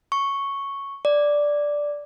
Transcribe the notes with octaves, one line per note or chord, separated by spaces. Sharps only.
C#6
D5